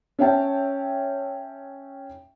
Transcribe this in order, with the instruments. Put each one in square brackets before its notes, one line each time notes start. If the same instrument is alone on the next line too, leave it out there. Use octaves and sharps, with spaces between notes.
[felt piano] C#4 C#5 E5 G5 A5